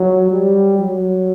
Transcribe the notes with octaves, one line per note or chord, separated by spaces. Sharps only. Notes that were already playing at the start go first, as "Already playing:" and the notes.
Already playing: F#3
G3
F#3